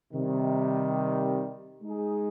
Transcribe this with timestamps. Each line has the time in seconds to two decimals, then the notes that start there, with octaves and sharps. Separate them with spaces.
0.13 C3 D#3 G3
1.82 G#3 D#4 G#4